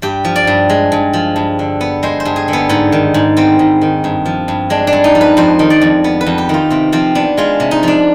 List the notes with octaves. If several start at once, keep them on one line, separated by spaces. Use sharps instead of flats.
G2 G4
F3
D5
G2
G#3
G2
F3
G2
D3
B3
G#3 C5
C5
G2
G#4
D3
B3
G#2 B3
D#3
G#2
B3 C4
G#2
D#3
G2
F3
G2
G#3 D4
D4
G2
D#4
F3
B4
F2 C5
D#3
D5
F2
B3
B4
F2
G4
D#3 F4
C3 C4
F3 C4
B3 D4
G#3 F4
C3
D#4
F3 D4